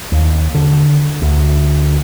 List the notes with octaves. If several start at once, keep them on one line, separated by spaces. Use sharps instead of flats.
D#2
D3
D2